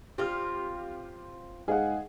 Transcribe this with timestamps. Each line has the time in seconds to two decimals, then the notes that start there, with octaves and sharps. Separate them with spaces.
0.18 C4 F4 G4 F6
1.68 G#2 G#4 D#5 F5 F#5